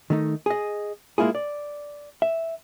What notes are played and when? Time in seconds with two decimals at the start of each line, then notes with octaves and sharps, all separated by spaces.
0.10 D#3 A3 D#4
0.46 G#4 D#5
1.18 G#3 A#3 E4 F4 G#4
1.35 D5
2.22 E5